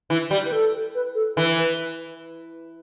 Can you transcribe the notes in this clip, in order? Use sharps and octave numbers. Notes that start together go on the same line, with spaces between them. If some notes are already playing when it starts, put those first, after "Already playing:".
E3 E4
G3 G4
B4
A4
B4
A4
E3 B4
B4